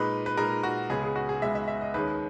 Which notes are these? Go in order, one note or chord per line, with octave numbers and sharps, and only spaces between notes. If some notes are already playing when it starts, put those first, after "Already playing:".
Already playing: A#2 G#3 D#4 B4
B4
A#2 G#3 D#4 A#4
F#4
C#2 C#3 G#3 B3 G#4
G#4
F#4
G#4
C#2 C#3 G#3 B3 E5
E5
E5
D#5
D#2 D#3 G#3 C#4 B4